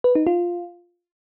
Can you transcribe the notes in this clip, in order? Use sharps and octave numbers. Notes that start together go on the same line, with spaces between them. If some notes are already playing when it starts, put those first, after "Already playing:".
B4
D#4
F4